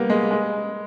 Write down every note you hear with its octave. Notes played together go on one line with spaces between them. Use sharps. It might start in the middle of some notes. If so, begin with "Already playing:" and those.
Already playing: G3 A#3 B3
G#3
G#3